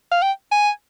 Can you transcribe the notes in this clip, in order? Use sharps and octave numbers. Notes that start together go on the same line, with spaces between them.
F5
G5
G#5